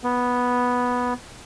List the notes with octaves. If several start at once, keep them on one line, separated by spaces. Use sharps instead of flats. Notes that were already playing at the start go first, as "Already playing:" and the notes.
B3